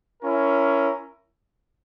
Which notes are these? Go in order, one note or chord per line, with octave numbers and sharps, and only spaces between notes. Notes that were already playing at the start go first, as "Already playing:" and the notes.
C#4 E4 A#4